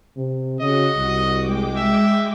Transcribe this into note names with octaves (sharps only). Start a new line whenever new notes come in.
C3
C#3 F#4 D#5
C2
G#3 G5 D6
E5